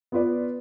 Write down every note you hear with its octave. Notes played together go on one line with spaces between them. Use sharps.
B3 F4 B4 D5